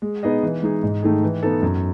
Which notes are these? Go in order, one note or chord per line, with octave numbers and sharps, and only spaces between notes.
G#3
B3 D#4 G#4 D#5
E3
G#3 D#4 G#4
G#2
D#3 A3 D#4 G#4
E3
B3 D#4 A4
F#2